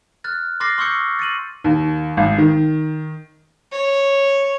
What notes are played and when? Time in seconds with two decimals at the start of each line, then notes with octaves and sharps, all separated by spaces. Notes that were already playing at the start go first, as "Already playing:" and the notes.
0.24 F6 F#6 A6
0.60 C6 D6 F6 A6 A#6 C7
0.78 C6 C#6 E6 G6 C#7
1.19 A6 C#7 D#7 F#7
1.64 D#2
2.17 G#1
2.38 D#3
3.72 C#5